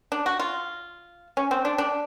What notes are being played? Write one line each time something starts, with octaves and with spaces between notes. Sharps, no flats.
D4
F#4
F4
C#4
C4
D4
D4